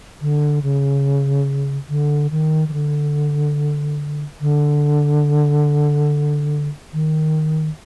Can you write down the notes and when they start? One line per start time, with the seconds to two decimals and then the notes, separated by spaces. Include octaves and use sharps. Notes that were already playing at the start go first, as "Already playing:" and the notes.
0.21 D3
0.63 C#3
1.89 D3
2.31 D#3
2.68 D#3
2.73 D3
4.41 D3
6.93 D#3